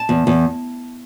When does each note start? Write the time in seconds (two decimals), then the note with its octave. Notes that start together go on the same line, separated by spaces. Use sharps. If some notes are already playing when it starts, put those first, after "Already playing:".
Already playing: A5
0.09 E2
0.27 E2